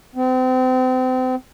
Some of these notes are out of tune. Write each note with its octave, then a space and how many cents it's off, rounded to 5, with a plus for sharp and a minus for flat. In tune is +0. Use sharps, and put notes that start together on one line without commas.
C4 -35